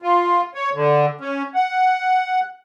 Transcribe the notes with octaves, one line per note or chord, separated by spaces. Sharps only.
F4
C#5
D3
C#4
F#5